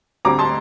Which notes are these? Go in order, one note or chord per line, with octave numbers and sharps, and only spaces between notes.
D2 D3 G3 C4 A#5 D6
A5 C6